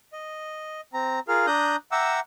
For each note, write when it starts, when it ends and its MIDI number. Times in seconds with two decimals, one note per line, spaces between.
0.13 0.81 75
0.94 1.20 60
0.94 1.20 82
1.28 1.46 65
1.28 1.46 68
1.28 1.46 70
1.28 1.46 77
1.28 1.46 89
1.47 1.76 62
1.47 1.76 82
1.47 1.76 87
1.47 1.76 90
1.47 1.76 91
1.92 2.20 76
1.92 2.20 78
1.92 2.20 79
1.92 2.20 82
1.92 2.20 86
1.92 2.20 88